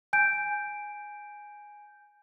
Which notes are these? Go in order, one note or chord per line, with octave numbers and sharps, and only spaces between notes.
G#5 G6 D7